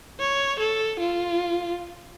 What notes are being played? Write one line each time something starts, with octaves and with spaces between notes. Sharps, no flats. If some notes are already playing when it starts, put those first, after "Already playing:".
C#5
A4
F4